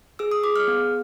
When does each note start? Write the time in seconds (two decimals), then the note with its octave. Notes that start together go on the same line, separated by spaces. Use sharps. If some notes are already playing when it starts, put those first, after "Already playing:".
0.19 G#4 E6
0.31 D#6
0.44 G#4 D6
0.56 F6
0.68 B3